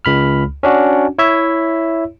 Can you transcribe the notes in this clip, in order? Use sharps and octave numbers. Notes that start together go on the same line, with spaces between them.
C#2 B5 F6
C#4 D4 F#4
E4 C#5 E5